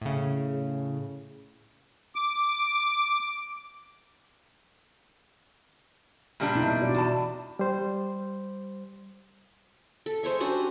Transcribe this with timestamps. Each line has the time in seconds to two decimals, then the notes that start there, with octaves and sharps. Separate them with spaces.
0.01 A2 C#3
2.15 D6
6.40 A#2 G3 D4
6.55 B2 D#4 E4
6.81 F#4 D5
6.95 E2 A5
7.59 G3 C5
10.06 A4
10.23 G#3 C5 C#5 E5
10.40 C#4 D4 F#4 G4